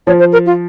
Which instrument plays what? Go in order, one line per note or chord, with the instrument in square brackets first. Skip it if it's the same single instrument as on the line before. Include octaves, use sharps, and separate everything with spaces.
[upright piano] F3 [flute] C#5
[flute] C5
A#4
F4